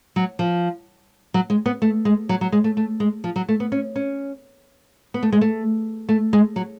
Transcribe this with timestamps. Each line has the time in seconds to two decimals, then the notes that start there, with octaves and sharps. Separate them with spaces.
0.16 F#3
0.39 F3
1.34 F#3
1.50 G#3
1.66 B3
1.82 A3
2.05 G#3
2.29 F#3
2.41 F#3
2.52 G#3
2.64 A3
2.77 A3
3.00 G#3
3.24 F3
3.36 F#3
3.49 A3
3.60 B3
3.72 C#4
3.96 C#4
5.14 B3
5.23 A3
5.33 G#3
5.41 A3
6.09 A3
6.33 G#3
6.56 F#3